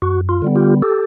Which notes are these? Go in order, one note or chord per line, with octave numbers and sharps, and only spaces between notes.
F#2 F#4
F4
D3 G3 B3
F4 G4
G4 A4